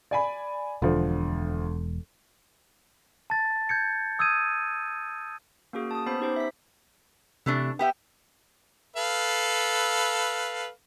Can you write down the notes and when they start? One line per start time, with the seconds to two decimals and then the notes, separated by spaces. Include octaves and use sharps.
0.11 D5 G#5 B5
0.82 E1 D2 D3 F3
3.30 A5 A6
3.69 G6 G#6 C#7
4.19 D#6 E6 G6 G#6 D#7
5.73 A#3 C#4 F#4 G#4
5.91 A5 D#6
6.06 B3 C#4 C5 B5
6.20 D#4 G4 C5
6.36 E5 B6
7.46 C3 E3 A3 D4
7.79 B3 G4 E5 G5
8.96 A4 B4 F5